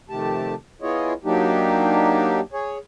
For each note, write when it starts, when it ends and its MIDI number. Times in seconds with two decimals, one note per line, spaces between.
0.09 0.54 41
0.09 0.54 48
0.09 0.54 51
0.09 0.54 57
0.09 0.54 67
0.09 0.54 81
0.82 1.13 59
0.82 1.13 64
0.82 1.13 65
0.82 1.13 68
0.82 1.13 73
0.82 1.13 75
1.24 2.40 54
1.24 2.40 58
1.24 2.40 62
1.24 2.40 63
1.24 2.40 67
2.53 2.78 68
2.53 2.78 73